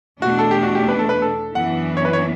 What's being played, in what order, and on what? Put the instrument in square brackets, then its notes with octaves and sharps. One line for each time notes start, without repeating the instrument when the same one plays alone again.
[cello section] E2 B2 A3 D4 [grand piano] F#4
[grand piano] A4
G4
F#4
G4
B4
A4
B4
A4
[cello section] F#2 E3 B3 D4 [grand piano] F#5
[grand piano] C#5
B4
C#5